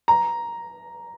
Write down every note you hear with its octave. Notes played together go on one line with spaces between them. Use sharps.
A#5